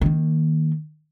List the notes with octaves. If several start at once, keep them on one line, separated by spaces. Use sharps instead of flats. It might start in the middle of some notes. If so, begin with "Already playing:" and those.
D#3 A#3